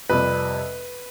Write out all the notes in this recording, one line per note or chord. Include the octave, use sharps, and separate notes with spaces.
F2 C3 G3 B4